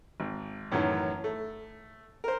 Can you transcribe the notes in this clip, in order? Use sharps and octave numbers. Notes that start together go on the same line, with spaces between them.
G#1
F#2 A2 D#3 E3 F#3 C#4
A3
A#4 C5